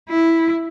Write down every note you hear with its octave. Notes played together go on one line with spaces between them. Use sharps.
E4